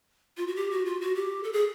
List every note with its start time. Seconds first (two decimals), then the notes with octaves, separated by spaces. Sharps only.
0.37 F4
0.47 F#4
0.56 G4
0.71 F#4
0.85 F4
1.01 F#4
1.15 G4
1.43 A4
1.53 G#4